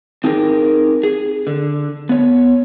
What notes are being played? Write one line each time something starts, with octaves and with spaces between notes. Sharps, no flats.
C4 D#4 G4 G#4 A#4
G#4
D3
B3 C#5